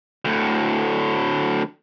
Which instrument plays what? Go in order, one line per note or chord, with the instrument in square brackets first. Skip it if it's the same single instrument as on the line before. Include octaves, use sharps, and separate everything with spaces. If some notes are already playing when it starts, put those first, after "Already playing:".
[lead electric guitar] D2 A2